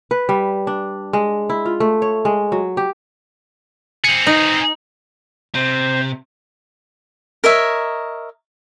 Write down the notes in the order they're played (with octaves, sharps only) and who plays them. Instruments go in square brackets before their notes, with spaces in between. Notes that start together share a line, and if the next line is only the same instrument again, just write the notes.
[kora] B4
G3
D4
G#3
E4
F4
A3
C#5
G#3
F#3
G4
[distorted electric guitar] C4 G#4 [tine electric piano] C#7
[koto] D#4
[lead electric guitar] C3 [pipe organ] C5
[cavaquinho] A#4 C#5 D#5 E5